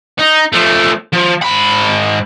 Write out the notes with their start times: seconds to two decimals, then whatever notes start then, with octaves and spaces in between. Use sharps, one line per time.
0.19 D#4
0.54 F3 A3
1.13 F3
1.42 G#2 B5